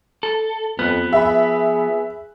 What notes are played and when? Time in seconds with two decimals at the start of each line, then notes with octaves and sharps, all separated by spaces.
0.23 A4
0.79 F2 F3 B3 F#6
1.13 G#4 E5 B5